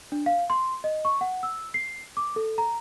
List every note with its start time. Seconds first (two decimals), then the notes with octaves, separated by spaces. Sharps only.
0.12 D4
0.26 F5
0.50 C6
0.84 D#5
1.05 C#6
1.21 F#5
1.43 E6
1.74 C7
2.17 D6
2.36 A4
2.58 A#5